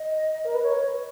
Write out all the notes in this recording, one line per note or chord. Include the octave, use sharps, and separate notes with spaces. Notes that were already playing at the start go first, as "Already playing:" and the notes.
Already playing: D#5
A#4
B4
C#5